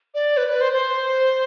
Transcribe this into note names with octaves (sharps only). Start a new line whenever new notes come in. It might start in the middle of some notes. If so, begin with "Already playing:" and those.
D5
B4
B4
C5
C5